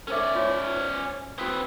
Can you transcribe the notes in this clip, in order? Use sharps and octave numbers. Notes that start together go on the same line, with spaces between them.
C#4 A#4 C5 D5 E5
F4 C#5 C#6
C5
C4 F#4 B4 G5 D#6